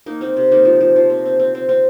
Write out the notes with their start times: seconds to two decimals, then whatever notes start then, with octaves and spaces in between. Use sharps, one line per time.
0.06 A#3 D#4
0.21 A#3 C4
0.37 C3
0.52 A#3 D#4
0.65 F3
0.81 F3
0.96 F3
1.10 C4
1.25 C4
1.40 C4
1.55 C4
1.69 C4